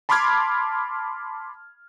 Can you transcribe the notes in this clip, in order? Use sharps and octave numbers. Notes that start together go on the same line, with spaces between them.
A5 B5 C6 D6 F6 G#6